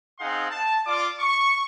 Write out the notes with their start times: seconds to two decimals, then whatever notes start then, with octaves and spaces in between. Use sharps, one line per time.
0.19 C4 D#4 G#4 F5 F#5 C6
0.49 A5
0.86 F4 D5 D6
1.20 C#6